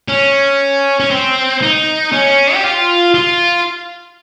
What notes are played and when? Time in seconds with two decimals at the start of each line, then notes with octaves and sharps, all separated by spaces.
0.08 C#4
1.00 C#4
1.11 C4
1.62 D#4
2.12 C#4
2.54 G4
2.64 F4
3.14 F4